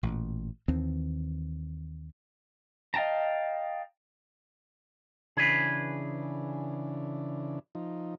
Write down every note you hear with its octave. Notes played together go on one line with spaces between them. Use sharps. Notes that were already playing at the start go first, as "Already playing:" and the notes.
A1 A#2
D#2 D#3 E3 C4
D#5 F5 G5 A5 A#5
C#3 E3 D4 G#4 B4
F3 D#4